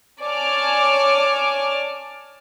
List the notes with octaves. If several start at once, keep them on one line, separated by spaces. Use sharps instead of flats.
C#5 D5 G#5 A5 D6 F6